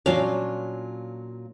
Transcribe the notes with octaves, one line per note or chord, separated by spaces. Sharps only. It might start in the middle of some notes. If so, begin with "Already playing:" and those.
A#2 F#3 C#4 D4 F4 F5